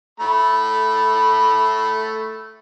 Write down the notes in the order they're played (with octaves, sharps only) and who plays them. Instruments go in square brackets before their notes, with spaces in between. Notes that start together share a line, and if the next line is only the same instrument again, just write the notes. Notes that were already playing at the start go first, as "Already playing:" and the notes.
[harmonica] A3 B5